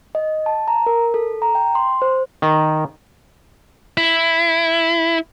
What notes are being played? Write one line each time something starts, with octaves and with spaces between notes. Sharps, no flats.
D#5
A5
A#5
A#4
A4
A#5
G5
C6
C5
D#3
E4